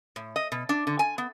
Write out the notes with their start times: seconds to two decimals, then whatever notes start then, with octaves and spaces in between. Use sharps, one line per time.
0.16 A2
0.36 D#5
0.52 B2
0.69 D4
0.87 D3
0.99 G#5
1.18 B3